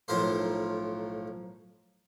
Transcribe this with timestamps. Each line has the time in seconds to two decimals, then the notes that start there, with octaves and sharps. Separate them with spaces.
0.08 B1 A2 F3 A#4 C5